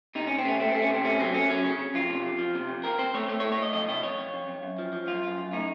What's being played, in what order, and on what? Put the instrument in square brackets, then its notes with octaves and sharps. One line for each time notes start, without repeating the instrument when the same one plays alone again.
[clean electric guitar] C3 D#4
C3 C#4
C4
A3 C#4
A3 C4
A3 C4
C#4
C3 C4
A3 C#4
F#3 C4
A3 C#4
F#3 C#4
C#3 C#4
C#3
F2 F4
C3
F2
F3
C3
F2
C4 A#4
C4 C5
A3 C#5
A3 C#5
C#5
A2
C#5
A2 D#5
F2 D#5
C3 D#5
F2 C#5
F2
F2
F2
F#2
F3
F3
F#2 F4
F#2 F4
F#2
A2 D#4